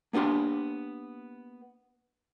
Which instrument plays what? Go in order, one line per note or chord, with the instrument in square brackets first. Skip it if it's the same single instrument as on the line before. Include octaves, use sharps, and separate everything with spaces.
[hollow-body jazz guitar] A#3 B3 D4 G4 C6